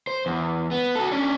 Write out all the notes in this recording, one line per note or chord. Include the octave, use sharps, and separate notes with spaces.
C5
E2
B3
F#4 A4
C#4 D4